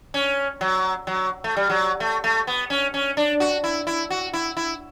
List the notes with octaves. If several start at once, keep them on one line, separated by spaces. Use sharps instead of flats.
C#4
F#3
F#3
A3
G3
F#3
A3
A3
B3
C#4
C#4
D4
F#4
E4
E4
F#4
E4
E4